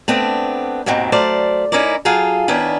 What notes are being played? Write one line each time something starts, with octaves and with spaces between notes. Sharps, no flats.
A3 B3 C4 D4
D#2 G#2 B2 D#3 C4
F#3 A3 C5 D5 F5
C#4 D#4 E4 A#4 D5
F#3 F4 G#4 A4 F5
D#3 B3 C#4 D4 E4